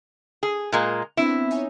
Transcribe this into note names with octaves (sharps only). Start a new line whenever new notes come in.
G#4
A#2 G#3 A#3
B3 C4 D4 E4
D#4 C#5 G#5